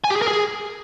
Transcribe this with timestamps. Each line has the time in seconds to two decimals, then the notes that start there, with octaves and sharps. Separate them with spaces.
0.04 G#5
0.10 G4
0.16 G#4
0.22 A#4
0.28 G#4